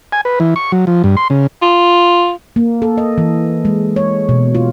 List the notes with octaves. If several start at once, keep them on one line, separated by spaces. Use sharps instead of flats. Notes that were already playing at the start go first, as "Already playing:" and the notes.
G#5
B4
E3
C#6
F#3
F3
G2
C6
C#3
F4
A#3
A4
D#5
E3
G#3
C#5
B2
F4